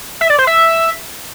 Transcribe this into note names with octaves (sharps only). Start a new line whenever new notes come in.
E5
D5
C5
E5